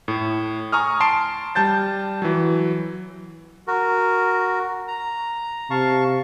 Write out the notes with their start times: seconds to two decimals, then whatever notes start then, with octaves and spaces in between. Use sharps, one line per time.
0.08 A2
0.72 G#5 A#5 C#6 D#6 F6
1.00 A5 C6 C7 D7
1.55 G3 A5 G6 A6
2.22 E3 F#3
3.67 F#4 A#4
4.88 A#5
5.70 C3 F5 A5 C#6